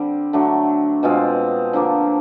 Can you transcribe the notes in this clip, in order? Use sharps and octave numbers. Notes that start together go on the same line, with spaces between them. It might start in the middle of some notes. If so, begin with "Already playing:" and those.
Already playing: D3 G3 C4
D3 F#3 A3 D4
B2 G#3 C4 F4
D3 F3 A#3 D4